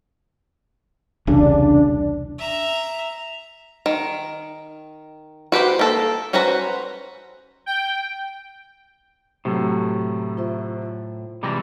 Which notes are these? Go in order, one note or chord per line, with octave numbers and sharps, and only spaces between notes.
E1 C2 C#3 D4
E5 A#5
D#3
F#4 G4 B4 C5
A#3 A4
C#4 F#4 B4 C5 A#5
G5
A2 C3 F#3 A3
F4 C5 E5
C3 E3 G3 G#3 A#6